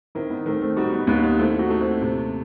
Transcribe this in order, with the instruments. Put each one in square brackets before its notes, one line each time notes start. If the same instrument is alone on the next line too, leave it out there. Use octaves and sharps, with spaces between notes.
[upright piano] D#3 [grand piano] C4 E4
[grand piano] B3 D#4
[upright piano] D#3 [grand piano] A3 C4
[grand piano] A3 C4
[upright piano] G3 [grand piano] D#4 F#4
[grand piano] B3 D#4
[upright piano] D#2 [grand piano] B3 D#4
[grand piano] B3 D#4
[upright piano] A3 [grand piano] C4 E4
[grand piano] E4
D#4 F#4
[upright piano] A3
[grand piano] C4 E4
[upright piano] C3